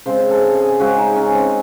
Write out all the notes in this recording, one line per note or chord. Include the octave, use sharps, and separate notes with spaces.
C#3 G#3 C4 C5
G#4
A4
G#4
C#3 G#3 C4 F#4
D#4
C#4
C4